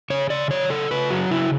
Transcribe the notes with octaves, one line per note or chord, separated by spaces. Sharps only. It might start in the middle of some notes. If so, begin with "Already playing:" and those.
C#3 C#5
C#3 D5
F#3 C#5
C#3 A4
C#3 B4
F#3 F#4
C#3 E4